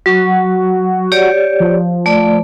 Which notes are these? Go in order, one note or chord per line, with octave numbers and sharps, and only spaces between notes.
F#3 F#4
G4 C#5 D5
F3
A3 D5